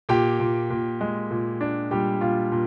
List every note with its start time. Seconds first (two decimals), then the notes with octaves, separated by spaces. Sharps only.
0.09 A#2 G4 G5
0.40 A#2
0.70 A#2
1.01 G#3
1.31 A#2
1.61 D4
1.91 A#2 G3 G4
2.21 A#2 F4
2.52 A#2